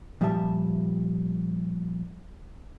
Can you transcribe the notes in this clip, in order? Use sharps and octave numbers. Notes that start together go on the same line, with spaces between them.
A#2 F3 G3 G4 E5 A5